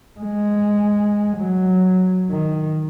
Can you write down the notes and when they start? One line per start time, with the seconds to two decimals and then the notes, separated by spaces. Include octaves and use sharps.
0.20 G#3
1.38 F#3
2.30 D#3